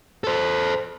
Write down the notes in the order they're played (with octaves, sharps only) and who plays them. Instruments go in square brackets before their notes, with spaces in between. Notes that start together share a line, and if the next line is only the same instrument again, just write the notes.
[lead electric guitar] A4 C5